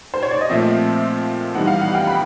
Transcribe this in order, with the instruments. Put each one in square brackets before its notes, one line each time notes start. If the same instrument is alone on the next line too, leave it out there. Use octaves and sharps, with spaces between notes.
[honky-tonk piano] C5
C#5
D5
D#5
[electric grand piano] A#2 F3 A3 C4 [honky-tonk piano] E5
[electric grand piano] E3 G3 B3 D#4 [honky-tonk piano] F#5
[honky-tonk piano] F5
F#5
G5
B5